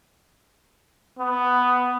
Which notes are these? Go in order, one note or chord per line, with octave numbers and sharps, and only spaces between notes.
B3